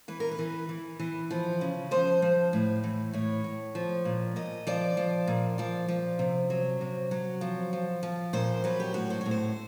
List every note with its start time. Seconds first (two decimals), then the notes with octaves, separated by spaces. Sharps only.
0.08 E3 B4
0.20 A#4
0.31 B4
0.39 E3
0.69 E3
0.99 E3
1.30 F3
1.61 C#3
1.91 F3 C5
2.22 F3
2.53 A2
2.84 E3
3.13 A2 C#5
3.44 A2
3.75 F3
4.05 A#2
4.36 A#2 D#5
4.67 F3 D5
4.97 F3
5.27 A#2
5.58 F3 D5
5.88 F3
6.19 C3
6.50 F#3
6.81 C3
7.11 F#3
7.41 F3
7.73 F3
8.03 F3
8.33 A#2 C5
8.64 F#3 B4
8.80 G4
8.94 A2 F#4
9.10 C5
9.21 A2 C#5
9.31 C5